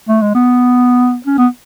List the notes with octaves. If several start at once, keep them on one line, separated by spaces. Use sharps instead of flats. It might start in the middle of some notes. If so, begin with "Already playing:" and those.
A3
G#3
B3
C#4
B3